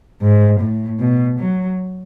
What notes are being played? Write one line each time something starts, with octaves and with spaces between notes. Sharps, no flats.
G#2
A2
B2
F#3